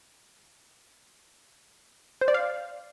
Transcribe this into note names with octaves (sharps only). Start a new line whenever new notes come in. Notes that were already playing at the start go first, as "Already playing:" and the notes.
C5
D5
F5